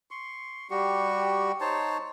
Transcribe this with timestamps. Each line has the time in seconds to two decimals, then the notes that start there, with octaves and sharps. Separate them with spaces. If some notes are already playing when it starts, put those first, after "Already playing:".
0.11 C6 C#6
0.70 G3 F#4 G4 C#6
1.61 D#4 C5 C#5 A5